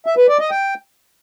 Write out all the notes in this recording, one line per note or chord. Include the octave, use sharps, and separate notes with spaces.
E5
B4
D5
D#5
G5